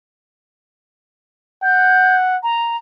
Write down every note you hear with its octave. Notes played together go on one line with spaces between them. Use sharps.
F#5 G6
A#5